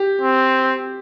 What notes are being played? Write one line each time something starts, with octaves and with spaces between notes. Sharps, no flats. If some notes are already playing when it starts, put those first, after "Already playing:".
Already playing: G4
C4